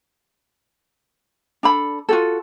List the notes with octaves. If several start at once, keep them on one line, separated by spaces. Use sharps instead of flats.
D4 A4 B5
F4 F#4 A4